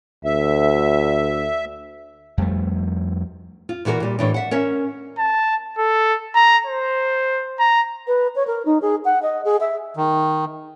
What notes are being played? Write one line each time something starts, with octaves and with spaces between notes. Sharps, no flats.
D2 E5
F2 G3 A3
F4
A#2 E3 F#4 A4 A#4
A#2 G3
A2 E3 D4
E5 F#5
C#4 A#4 E5
A5
A4
A#5
C5
A#5
B4
C#5
A#4
D#4
G#4
F#5
D#5
G#4
E5
D#3